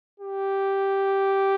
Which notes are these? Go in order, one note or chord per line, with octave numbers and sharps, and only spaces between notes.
G4